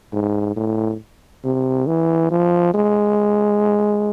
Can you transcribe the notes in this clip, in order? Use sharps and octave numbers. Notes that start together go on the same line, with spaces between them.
G#2
A2
C3
E3
F3
G#3